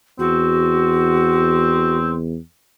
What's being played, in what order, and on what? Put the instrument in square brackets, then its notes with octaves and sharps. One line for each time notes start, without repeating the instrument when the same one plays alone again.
[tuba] E2 [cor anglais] C4 [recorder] F#4